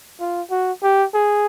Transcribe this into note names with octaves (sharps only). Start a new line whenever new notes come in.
F4
F#4
G4
G#4